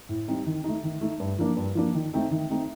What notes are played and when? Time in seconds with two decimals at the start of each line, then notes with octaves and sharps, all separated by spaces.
0.09 A2
0.28 G3 C4 D#4
0.46 D#3
0.64 A3 D#4
0.83 D#3
1.01 A3 D#4
1.20 G2
1.38 F3 A#3 D4
1.57 G2
1.75 F3 A#3 D4
1.95 D#3
2.13 A3 C4 D#4
2.31 D#3
2.50 A3 C4 D#4